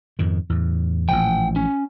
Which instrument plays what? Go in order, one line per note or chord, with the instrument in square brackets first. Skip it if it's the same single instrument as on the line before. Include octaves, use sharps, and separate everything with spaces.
[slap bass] F2 G#2 D#3
E2 A2
[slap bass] A1 A#2 F3 [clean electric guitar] F#5 G5
[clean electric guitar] C#4